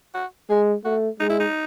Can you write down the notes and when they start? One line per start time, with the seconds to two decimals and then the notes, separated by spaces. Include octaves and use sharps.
0.14 F#4
0.50 G#3 G#4
0.85 A3 F#4
1.20 G#3 D#4
1.29 E4
1.40 D#4